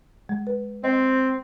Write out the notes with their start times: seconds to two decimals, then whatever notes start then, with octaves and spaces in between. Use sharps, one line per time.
0.29 G#3
0.47 B4
0.84 C4 D#5